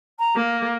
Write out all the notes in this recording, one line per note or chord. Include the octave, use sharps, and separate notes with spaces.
A#5
A#3